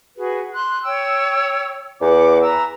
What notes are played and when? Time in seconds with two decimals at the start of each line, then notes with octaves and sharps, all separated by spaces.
0.17 F#4 G#4 B4
0.54 C6 F#6
0.84 C#5 G5 E6
2.01 E2 F#5 D6
2.42 B4 A#5 E6